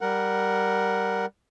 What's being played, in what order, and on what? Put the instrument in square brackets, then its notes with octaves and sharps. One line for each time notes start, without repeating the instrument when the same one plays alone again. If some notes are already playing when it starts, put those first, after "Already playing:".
[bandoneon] G3 A#4 F#5